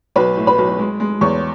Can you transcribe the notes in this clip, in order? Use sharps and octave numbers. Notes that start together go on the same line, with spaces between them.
B1 B4 B5
A2
B4 B5
B1
G#3
G#3
E2 C#5 C#6